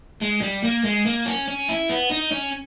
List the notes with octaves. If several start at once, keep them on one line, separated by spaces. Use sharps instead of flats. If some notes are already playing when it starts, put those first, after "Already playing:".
G#3
G3
A#3
G#3
A#3
C#4
C#4
E4
B3
D#4
C#4